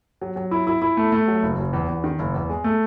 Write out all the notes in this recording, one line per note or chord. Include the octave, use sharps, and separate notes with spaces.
F#3
F#3
E4
E4
E4
A3
A3
F#3
F#1
F#1
E2
E2
D#3
F#1
E2
G#3
A3